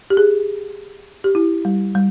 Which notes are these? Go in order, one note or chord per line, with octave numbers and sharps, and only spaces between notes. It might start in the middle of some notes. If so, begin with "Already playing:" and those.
G4
G#4
G4
E4
G3
G3